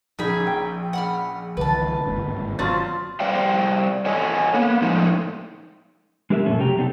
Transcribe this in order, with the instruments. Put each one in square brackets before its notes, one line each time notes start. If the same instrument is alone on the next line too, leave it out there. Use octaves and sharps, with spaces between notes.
[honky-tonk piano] A#1 C#3 [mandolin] D#4 G#4 B5
[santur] G5
[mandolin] F#5 B5 F6
[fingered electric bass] C2 D3 E3 [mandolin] B4 A5
[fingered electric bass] G1 D#2 G#2
[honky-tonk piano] F#3 A5 A6 [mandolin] C4 C#4 [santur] F4 D5
[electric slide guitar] G3 C5 D5 F5 G5
A4 C#5 D#5 G#5
A#3 B3
A2 F3 G#3 A3 D#4
G#3 D4 G4 A#4 C#5 E5
F2 A#2 F#3 A3 C#4 A4
C3 F#3 G4 G5 A#5
B3 C4 D4 D#4 G4 A4